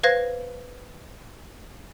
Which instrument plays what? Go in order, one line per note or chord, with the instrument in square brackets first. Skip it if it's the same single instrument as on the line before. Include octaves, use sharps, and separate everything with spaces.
[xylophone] B4 C5 F5 G#6 A#6